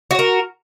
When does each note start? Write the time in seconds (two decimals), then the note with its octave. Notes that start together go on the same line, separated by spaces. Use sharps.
0.11 F#4
0.15 C#5
0.19 A#4